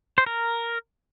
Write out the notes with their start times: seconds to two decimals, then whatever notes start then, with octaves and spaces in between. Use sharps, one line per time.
0.18 C5
0.26 A#4